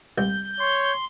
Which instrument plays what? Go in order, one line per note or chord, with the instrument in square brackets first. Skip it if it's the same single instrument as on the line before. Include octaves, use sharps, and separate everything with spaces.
[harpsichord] C2 [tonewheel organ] G6
[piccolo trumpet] C#5 [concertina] C6